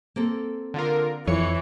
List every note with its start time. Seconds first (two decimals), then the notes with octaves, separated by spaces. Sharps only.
0.16 A#3 C4 A4
0.74 D3 F4 A#4
1.27 F2 E3 C#5 C#7